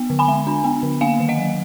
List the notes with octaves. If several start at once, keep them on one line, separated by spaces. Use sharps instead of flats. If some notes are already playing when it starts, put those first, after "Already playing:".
Already playing: B3
D3
G#5 B5
G#3
D4
B3
D3
A#3 F5 G#5
D#3
D#5 F#5
F#3